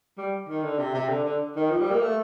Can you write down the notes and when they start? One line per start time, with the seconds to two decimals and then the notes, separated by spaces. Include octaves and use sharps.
0.18 G3
0.48 D#3
0.64 D3
0.79 C3
0.94 C3
1.09 D3
1.25 D3
1.56 D#3
1.70 F3
1.80 G3
1.91 A#3
2.02 A3